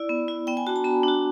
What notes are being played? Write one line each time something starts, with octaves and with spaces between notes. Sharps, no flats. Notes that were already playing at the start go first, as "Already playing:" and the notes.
Already playing: E4 D5
B3
E4
B3 G5
G#5
D4 F#4 A5
A#5
B3 B5
D4
F#4